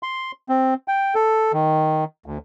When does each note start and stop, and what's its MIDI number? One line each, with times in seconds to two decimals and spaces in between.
0.03 0.32 84
0.49 0.74 60
0.88 1.15 79
1.15 1.52 69
1.53 2.04 51
2.26 2.38 38